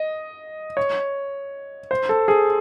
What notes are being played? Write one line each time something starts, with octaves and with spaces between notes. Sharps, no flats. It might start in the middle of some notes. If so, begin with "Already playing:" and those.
Already playing: D#5
C#5
C5
A4
G#4